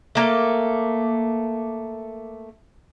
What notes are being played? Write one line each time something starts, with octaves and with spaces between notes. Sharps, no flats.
A3 A#3 F5